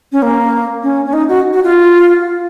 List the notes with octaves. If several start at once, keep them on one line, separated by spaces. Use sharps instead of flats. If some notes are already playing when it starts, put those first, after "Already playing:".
C#4
A#3
C#4
C#4
D#4
F#4
F#4
F4